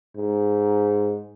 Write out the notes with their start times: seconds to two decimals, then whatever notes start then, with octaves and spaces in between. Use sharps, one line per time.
0.17 G#2